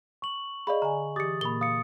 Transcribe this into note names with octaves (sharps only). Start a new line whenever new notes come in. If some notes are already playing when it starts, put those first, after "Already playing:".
C#6 F#7
G#4 D5 D#5 F5 B5
D3 G#5 A#5
E3 G4 D6 D#6 A6 C#7
A#2 A#3 B5 G7
F5 D#6 C#7